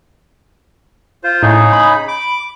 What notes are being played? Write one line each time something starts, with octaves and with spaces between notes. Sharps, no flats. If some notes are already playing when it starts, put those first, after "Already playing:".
F4 C5
A2 C#3 D#4 G#4
B5
D6